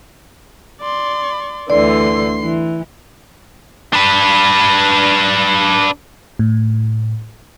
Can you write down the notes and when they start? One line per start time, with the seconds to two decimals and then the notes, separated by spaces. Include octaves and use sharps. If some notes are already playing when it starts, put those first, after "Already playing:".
0.81 D5 C6
1.70 D2 D3 E3 D5 C6 C7
2.43 E3
3.93 D4 B4
6.39 A2